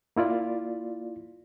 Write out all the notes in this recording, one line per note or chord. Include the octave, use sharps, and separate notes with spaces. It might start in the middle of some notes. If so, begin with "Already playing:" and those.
A#3 E4 F4 D5